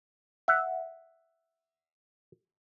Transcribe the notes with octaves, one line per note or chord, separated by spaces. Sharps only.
E5 F#5